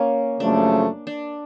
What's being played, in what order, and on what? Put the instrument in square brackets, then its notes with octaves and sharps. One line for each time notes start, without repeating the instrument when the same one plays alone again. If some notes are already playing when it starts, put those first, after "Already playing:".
Already playing: [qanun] A#3 C#4
[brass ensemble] F#2 C#3 F3 A3 [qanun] D4
[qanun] D4